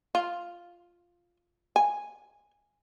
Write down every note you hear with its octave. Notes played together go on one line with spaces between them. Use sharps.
F4
G#5